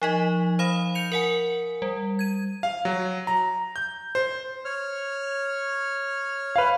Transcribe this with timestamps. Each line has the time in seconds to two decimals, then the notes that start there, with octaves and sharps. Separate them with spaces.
0.02 F3 D#4 D#5
0.59 C5 F5 B5 D#6
0.95 G6 C#7 F7
1.12 A#4 F#5 G#5
1.82 G3
2.19 G#6 D#7
2.63 F5
2.85 F#3
3.27 A#5
3.76 G6
4.15 C5
4.65 C#5 F6
6.56 B4 F5